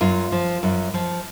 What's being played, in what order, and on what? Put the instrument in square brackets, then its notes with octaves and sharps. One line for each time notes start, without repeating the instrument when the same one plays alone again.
[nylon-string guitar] F#2 F4
F3
F#2
F3